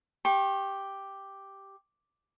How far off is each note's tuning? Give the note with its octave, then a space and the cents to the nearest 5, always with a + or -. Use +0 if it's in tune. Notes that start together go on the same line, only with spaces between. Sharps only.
G4 +0 C#6 -40